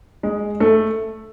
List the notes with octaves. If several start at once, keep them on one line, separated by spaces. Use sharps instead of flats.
G#3
A3